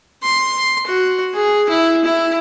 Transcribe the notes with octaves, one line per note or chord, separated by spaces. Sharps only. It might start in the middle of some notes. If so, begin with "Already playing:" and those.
C6
F#4
G#4
E4
E4